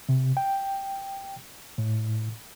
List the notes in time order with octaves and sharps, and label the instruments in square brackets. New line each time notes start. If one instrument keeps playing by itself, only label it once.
[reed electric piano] C3
G5
A2